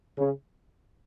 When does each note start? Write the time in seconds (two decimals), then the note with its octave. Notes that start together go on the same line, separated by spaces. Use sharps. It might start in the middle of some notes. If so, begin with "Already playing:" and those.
0.18 C#3